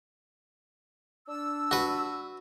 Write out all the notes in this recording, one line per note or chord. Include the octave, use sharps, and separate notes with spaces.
D4 E6
F#4 B4